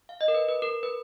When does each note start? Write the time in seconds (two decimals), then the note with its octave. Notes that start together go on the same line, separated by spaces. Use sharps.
0.09 F5
0.21 D#5
0.28 A#4
0.34 B4
0.49 B4
0.62 A#4
0.83 B4